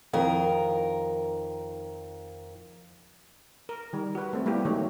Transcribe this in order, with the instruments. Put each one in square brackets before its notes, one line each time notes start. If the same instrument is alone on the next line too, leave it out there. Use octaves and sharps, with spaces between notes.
[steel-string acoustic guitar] F2 D#3 A#4
[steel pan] A#4
D#3 G3
F#4 B4
A3 C4
G3 A#3 B3 E4 G4
D#3 F#3 A3 C#5